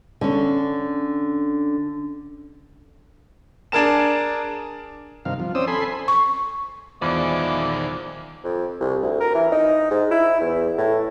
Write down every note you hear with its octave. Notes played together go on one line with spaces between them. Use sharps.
D3 C#4
D4 G#4 A#4 A5 E7
G2 C3 D#3 F5
F3
C4 C#4 C5 D5 D#6 E6
A4 G#5 B5 C6
C#6
E2 D#3 F3 G#3 E4 D5 D6
F2
C2
D2
A#4
E3
D#4
G#2
E4
E2
A2